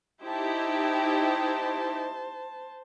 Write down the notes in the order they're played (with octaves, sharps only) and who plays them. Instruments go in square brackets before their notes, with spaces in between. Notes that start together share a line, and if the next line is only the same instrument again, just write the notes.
[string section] D#4 E4 G4 [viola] C5 A5